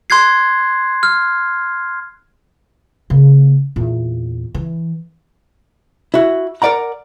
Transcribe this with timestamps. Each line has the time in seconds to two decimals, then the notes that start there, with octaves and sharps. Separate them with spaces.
0.10 C6 F#6 G#6 C7
1.03 F6
3.10 C#3 A#3
3.76 E2 A#2
4.55 E3
6.14 E4 F#4
6.62 A#4 B4 D5 F#5 A#5